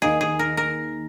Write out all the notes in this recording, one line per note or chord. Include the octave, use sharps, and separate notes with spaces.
D#2 D#3 A#3 D#4 G#4
G#4
A#4
A#4